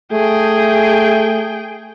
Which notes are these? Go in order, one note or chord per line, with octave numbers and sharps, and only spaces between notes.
A3 G#4 G5